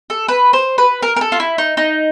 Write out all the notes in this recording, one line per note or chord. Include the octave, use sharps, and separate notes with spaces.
A4
B4
C5
B4
A#4
A#4
A4
F4
E4
D#4
D#4